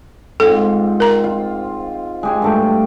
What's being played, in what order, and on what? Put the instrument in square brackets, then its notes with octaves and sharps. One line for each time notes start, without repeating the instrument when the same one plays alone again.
[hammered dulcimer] G#2 C4 F4 [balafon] A4
[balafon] A#4 A#5
[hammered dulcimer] F4
G#3 G4 G#5
G2 A3 G5